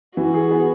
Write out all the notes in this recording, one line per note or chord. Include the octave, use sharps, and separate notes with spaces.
E3 F#4
G#4
B3